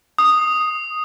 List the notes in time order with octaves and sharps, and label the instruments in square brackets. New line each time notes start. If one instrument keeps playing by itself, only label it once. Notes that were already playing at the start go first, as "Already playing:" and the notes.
[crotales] D#6